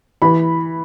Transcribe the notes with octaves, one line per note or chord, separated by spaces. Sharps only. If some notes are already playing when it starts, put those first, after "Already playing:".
E3 B5